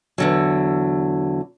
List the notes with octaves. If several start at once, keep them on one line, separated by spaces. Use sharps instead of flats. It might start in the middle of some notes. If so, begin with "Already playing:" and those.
E2 D3 F#3